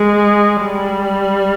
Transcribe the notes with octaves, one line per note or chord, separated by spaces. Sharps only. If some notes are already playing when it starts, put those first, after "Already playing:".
Already playing: G#3
G3